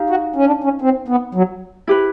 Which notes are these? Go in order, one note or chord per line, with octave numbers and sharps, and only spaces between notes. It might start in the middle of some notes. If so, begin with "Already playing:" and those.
Already playing: D#4 G4 F5
F#4
C#4
D4
C#4
C4
B3
F#3
E4 G4 B4